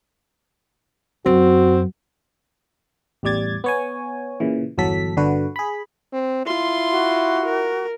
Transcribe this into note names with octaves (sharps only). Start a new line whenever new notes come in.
F#2 C4 F#4
A1 E2 G3 D5 G#6 A6
B3 C#5 G#5
A#2 C#3 E3
G1 E2 F#3 A4 B6
G1 D3 F#4 B4
G#4 B5
C4
E4 F4 C6
F#4
A#4